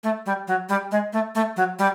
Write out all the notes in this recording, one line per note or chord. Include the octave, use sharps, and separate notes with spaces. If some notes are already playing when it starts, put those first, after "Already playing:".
A3
G3
F#3
G3
G#3
A3
A3
F#3
G3